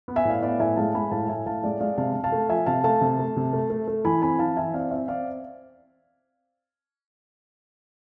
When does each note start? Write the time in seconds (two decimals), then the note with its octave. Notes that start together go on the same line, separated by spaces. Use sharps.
0.08 B3
0.16 E5 G#5
0.25 A2 D5 F5
0.42 B3 D5 F5
0.59 A2 E5 G#5
0.76 G#3 F5 A5
0.94 G#3 G#5 B5
1.11 A2 F5 A5
1.28 A2 E5 G#5
1.46 A2 F5 A5
1.63 G#3 D5 F5
1.80 G#3 D5 F5
1.98 C3 F5 A5
2.15 C3
2.24 F5 A5
2.32 A3
2.49 F3 E5 G#5
2.66 C3 F5 A5
2.84 A3 F5 A5
3.01 C3
3.19 A3
3.36 C3
3.53 A3
3.70 A3
3.87 A3
4.05 E3 G#5 B5
4.22 C4 G#5 B5
4.39 E3 F5 A5
4.57 E3 E5 G#5
4.74 C4 D5 F5
4.91 C4 C5 E5
5.08 C4 D5 F5